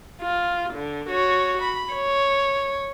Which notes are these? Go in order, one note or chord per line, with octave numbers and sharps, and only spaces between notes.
F4
D3
F#4 C#5
B5
C#5